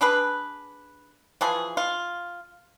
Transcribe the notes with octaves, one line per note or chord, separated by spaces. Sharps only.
D4 G#4 B4
E3 F3 G#4
F4